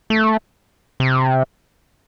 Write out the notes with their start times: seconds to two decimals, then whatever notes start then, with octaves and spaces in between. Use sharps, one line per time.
0.10 A3
1.00 C3